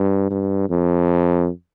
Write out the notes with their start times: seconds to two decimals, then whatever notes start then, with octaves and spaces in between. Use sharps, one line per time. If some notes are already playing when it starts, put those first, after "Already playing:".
Already playing: G2
0.31 G2
0.70 F2